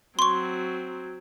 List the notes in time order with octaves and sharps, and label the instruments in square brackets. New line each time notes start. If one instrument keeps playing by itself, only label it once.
[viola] F#3 C4 [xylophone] C6 C#6